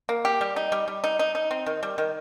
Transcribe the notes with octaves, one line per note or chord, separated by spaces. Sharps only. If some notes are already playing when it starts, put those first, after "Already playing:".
A#3
G4
G3
D#4
G3
G3
D#4
D#4
D#4
C4
D#3
G3
D#3